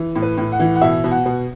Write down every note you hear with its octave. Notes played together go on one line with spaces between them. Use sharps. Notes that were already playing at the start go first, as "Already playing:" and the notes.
Already playing: E3
A2
B4
A2
F#5
E3
F#5
B2 E5
B2
F#5
B2